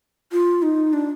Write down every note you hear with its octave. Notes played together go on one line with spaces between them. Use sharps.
F4
D#4
D4